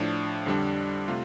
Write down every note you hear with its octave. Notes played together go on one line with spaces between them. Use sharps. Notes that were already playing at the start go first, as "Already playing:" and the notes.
Already playing: A2 F3 D4
F2 D3 G3 D4
C3 A3 F4